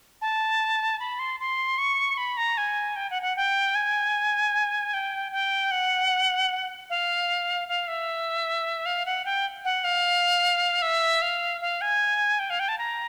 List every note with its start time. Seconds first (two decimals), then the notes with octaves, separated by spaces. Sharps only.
0.22 A5
1.00 B5
1.19 C6
1.40 C6
1.78 C#6
2.17 B5
2.37 A#5
2.58 G#5
2.96 G5
3.10 F#5
3.22 F#5
3.37 G5
3.75 G#5
4.94 G5
5.32 G5
5.71 F#5
6.90 F5
7.68 F5
7.88 E5
8.86 F5
9.06 F#5
9.25 G5
9.65 F#5
9.84 F5
10.82 E5
11.22 F5
11.61 F5
11.81 G#5
12.39 G5
12.50 F5
12.60 G5
12.69 A5
12.78 A#5